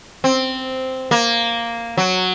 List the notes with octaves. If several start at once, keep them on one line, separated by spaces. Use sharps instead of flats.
C4
A#3
F#3